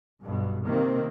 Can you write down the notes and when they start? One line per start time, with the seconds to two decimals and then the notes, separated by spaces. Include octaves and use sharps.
0.23 B1 G2 B2
0.66 C3 D#3 A#3 C4